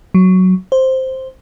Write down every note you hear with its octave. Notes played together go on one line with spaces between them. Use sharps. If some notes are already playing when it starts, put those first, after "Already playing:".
F#3
C5